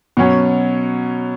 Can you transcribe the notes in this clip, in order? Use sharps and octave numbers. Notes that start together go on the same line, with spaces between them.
B2 F#3 C#4